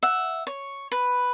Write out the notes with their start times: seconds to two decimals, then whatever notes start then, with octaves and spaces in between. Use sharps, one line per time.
0.03 E5 F#5
0.47 C#5
0.92 B4